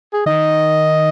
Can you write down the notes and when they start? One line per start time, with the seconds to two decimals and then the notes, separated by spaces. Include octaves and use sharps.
0.13 G#4
0.26 D#3 D#5